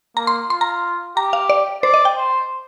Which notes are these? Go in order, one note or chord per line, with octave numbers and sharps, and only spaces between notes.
A#3 A#5
C6
F4 C6
A#5
G4 A#5
F5
D5
C5 D5
D#5
G5
C5